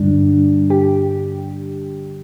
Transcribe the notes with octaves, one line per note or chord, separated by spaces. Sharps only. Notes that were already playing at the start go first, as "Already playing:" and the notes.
Already playing: G2 D3 G3 D4
G4